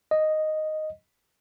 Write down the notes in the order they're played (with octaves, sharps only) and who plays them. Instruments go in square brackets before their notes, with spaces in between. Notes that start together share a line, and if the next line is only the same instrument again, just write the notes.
[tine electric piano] D#5